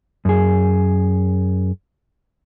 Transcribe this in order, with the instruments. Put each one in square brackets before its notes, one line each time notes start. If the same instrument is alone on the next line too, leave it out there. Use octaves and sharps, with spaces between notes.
[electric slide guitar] F#2 G#4